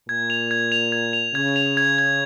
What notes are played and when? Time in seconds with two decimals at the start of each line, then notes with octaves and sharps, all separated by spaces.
0.09 A#2 G#6
0.30 F7
0.51 G#6
0.72 F7
0.92 G#6
1.13 F7
1.34 C#3 G#6
1.56 F7
1.77 G#6
1.98 G#6